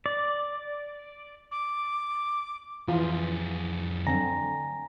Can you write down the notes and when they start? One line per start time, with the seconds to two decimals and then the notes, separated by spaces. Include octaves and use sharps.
0.06 D5
1.51 D6
2.88 F2 E3 F4 G#4
4.07 D3 C4 G#5 A#5 A#6